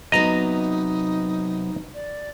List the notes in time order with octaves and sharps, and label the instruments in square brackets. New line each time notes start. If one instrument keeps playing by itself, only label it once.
[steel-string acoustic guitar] C3 F#3 B3 [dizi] D#4 [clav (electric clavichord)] D#5 A#5
[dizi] D5